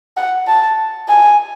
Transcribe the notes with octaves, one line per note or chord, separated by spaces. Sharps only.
F#5
A5
G#5